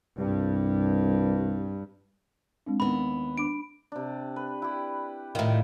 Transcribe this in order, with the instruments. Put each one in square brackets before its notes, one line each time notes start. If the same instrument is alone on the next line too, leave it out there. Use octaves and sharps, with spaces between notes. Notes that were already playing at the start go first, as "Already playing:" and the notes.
[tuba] C2 [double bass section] G2
[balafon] G#3 C4 D4
[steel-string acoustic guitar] D#2 B3 [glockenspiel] B5
[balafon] D4 D6 [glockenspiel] D7
[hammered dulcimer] C3 D4
B4
E4 G4
[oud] A2 D#3 [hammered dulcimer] F4 A#4